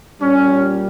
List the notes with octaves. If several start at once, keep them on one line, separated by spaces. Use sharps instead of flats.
A#2 G3 C#4